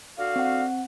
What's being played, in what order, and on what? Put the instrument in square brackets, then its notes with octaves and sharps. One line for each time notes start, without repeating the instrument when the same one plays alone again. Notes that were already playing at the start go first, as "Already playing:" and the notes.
[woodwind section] D3 F#4 F5
[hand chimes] C4 F#5